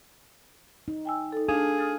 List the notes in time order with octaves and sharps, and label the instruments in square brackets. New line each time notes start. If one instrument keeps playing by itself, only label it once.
[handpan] D#4
[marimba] G5 G#5 E6
D#4 A4
[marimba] D4 [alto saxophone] G#4 [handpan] A4 F5
[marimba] D#6 F6 A6